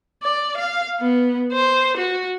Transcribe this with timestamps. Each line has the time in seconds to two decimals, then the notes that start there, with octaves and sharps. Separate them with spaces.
0.23 D5
0.57 F5
1.01 B3
1.53 C5
1.97 F#4